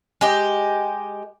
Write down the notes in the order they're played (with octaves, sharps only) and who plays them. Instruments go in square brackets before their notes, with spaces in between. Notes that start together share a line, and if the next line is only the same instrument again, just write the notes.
[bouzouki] G#3 G4